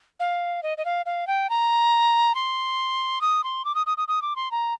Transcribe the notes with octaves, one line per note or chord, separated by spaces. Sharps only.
F5
D#5
D#5
F5
F5
G5
A#5
C6
D#6
C6
D6
D#6
D#6
D#6
D#6
D6
C6
A#5